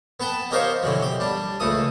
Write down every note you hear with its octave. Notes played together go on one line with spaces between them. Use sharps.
B3 B4 G5 A5
D#4 G4 A#4 C5 C#5 F5
B2 D3 E3 F#3
G4
G3 D4
C#2 A2 A4 D#6